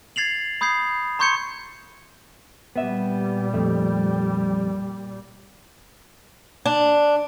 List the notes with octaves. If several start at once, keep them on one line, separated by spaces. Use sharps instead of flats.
G#6 A6 C7 F7 F#7
B5 D#6 G6 G#6 C7
A#5 C6 C#6 G6 G#6 C#7
A#2 G3 B3 E5
F2 A3
D4